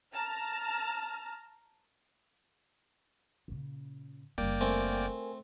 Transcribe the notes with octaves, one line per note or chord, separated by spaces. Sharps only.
A5 A#5 F6
A#2 C#3
F#1 G3 A#3 D5 G5
A3 C4 A#4 G#5